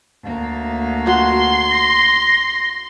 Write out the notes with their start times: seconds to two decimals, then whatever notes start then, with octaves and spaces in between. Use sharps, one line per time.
0.24 D2 A#3
1.07 F#4 C6
1.71 A#6